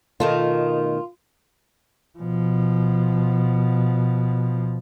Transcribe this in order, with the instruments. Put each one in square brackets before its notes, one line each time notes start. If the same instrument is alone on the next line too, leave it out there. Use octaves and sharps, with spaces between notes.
[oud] B2 D#3 A3 [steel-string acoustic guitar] F4
[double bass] B2 F3